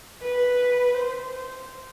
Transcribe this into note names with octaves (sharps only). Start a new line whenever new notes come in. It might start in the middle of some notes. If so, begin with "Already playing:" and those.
B4
C5
C5